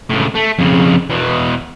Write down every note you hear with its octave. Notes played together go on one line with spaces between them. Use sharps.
C#2 A2
A3
F2 C#3
E2 B2